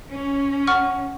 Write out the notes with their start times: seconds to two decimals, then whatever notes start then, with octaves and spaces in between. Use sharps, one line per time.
0.11 C#4
0.67 F#5 C#6 F6